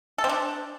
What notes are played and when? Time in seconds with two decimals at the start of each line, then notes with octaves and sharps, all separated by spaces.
0.18 A4
0.24 C4
0.29 D4